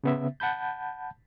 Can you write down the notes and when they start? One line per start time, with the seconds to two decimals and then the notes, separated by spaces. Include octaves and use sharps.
0.04 C#3 B3 E5
0.40 F#5 A5 B5 G6